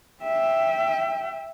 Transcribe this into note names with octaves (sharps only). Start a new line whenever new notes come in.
E5 G5